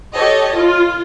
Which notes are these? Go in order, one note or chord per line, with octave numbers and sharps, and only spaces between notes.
G4 A4 C#5 D#5
F4